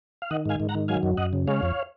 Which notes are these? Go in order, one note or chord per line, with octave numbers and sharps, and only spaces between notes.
F5
D#3 D#5 F#5
G#2 F5 G#5
G#2
F#5 A#5
D#3
F#3 F5 G#5
F#2
F#2 D#5 F#5
C#3
G#3 C#5 F5
F2